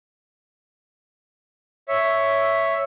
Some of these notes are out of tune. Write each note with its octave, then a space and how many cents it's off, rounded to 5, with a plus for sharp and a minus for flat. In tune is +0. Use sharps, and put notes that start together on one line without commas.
C#5 +0 E5 +0